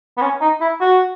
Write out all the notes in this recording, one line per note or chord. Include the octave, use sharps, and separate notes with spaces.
B3
C#4
D#4
E4
F#4